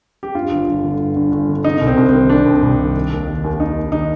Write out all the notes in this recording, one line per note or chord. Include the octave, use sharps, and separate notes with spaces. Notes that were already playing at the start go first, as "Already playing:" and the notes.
G4
G2 F4
G1
G1
D3
G2
G1
G1
D3
C3 D#4
C2
C4
C2
C4
D#3
C3 D4
C2
C2
D#3
D#3
D#2
D#3
D#2
D#3 D#4
D#2
D#3 D#4